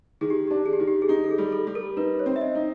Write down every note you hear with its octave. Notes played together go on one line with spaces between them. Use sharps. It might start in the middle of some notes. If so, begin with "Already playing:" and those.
D#3 G#4
G4
D4 G4
G#4
G4
D#3
G4
G#4
D#4 G4
A4
G#4
G3
A4
G3
A#4
D#4 B4
C#5
C4
E5
D#5
D#4